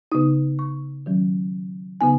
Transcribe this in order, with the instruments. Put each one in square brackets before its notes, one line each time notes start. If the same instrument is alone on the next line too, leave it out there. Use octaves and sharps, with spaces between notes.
[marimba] C#3 B3 D#4 D#6
C#6
D#3 F#3 C#4
C#3 B3 D#4 G#5